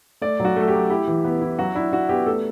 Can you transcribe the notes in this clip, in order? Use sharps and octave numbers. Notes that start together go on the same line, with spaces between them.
A3 D5
F#3
F#4
A3 A4
G4
F#3
E4 G4
E3
B3
E4
F#3 F#4
D4 E4
D4 F#4
B3 G4
A3 A4